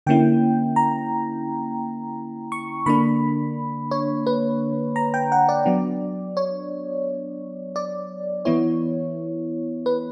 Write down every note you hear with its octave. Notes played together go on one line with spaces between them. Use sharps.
D3 A#3 C#4 E4 G5
A#5
C#6
D3 A#3 D4 B5
C#5
B4
A#5
G5
F#5
D5
F#3 B3 D4
C#5
D5
E3 B3 E4 C#5
B4